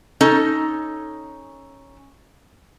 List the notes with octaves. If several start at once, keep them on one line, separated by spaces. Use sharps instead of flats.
C#4 D#4 A4